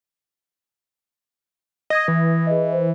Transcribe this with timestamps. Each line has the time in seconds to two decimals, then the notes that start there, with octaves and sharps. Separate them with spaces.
1.90 D#5 D#6 G#6 A#6
2.08 E3
2.47 G#4 D#5
2.72 C5